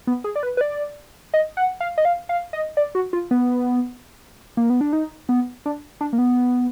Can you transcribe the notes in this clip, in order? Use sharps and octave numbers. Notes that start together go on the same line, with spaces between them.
B3
G#4
D5
B4
B4
D5
D#5
F#5
F5
D#5
F5
F5
D#5
D5
F#4
F4
B3
A#3
B3
D4
D#4
B3
D4
D4
A#3
B3